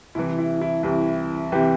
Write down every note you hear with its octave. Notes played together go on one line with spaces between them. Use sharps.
C2 C3 E3 E4
E4
E4
C2 C3 E3
C3 E3 G4